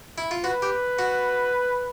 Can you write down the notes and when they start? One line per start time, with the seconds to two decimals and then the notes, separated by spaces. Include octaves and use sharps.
0.18 E4
0.31 F4
0.44 F#4 B4
0.62 G4
0.99 F#4